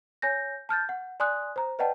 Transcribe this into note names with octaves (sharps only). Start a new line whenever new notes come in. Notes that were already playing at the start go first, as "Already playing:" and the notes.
C#5 G#5 G6 A#6
A5 F6 G6 A6
F#5
D5 G#5 C6 D#6 F#6
C5 A#5
B4 D5 D#5 F#5 G5 A5